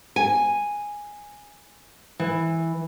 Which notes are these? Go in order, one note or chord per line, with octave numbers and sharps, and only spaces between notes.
G#5
E3